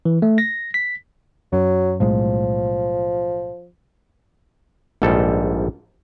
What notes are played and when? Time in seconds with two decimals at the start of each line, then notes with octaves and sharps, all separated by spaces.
0.05 E3
0.22 A3
0.38 A#6
0.74 B6
1.53 F#2 F#3
2.00 B1 A2 F3 G#3
5.02 A#1 G#2 G3 A4